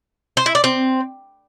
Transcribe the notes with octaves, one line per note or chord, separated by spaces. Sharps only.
C5
E4
D5
C4